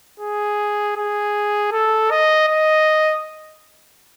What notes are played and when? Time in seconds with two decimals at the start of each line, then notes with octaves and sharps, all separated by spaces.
0.20 G#4
0.97 G#4
1.72 A4
2.11 D#5
2.48 D#5